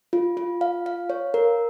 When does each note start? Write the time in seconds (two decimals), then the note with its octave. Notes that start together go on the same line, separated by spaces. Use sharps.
0.13 F4
0.37 F4
0.61 F5
0.86 F5
1.10 C#5
1.34 A#4